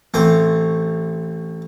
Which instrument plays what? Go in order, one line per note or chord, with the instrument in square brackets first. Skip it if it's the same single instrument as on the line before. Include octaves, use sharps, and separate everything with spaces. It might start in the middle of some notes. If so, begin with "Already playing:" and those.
[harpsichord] A1 A3 C4 C5 G#5 D6